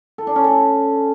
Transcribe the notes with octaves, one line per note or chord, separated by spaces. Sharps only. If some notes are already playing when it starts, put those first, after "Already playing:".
A4
D4
C#4
A4